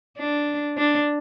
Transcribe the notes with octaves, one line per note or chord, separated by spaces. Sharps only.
D4
D4